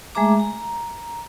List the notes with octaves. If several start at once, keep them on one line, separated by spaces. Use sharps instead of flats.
G#3 A3 G#4 E5 A#5 D6
A#5